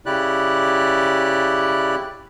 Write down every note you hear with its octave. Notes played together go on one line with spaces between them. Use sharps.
C#3 E4 G4 D5 F#6